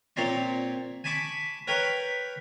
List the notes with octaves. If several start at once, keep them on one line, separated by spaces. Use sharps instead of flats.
A#2 C4 C#5 D5 A#5 C6
G#5 A5 B5 C#6 D6
A#4 B4 C#5 G5 B5